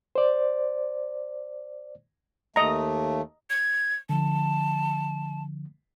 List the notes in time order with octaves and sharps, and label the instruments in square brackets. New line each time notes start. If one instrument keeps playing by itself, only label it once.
[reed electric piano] C5 D5
[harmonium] D#2 A3 [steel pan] D#5 A#5
[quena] G#6
[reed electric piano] D3 F3 [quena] A5